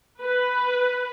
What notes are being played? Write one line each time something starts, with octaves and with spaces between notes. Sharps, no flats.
B4